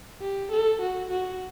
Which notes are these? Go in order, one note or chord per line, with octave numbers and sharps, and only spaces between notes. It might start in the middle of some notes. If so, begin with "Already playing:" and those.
G4
A4
F#4
F#4